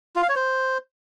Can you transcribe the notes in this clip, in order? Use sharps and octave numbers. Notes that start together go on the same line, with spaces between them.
F4
F5
C#5
C5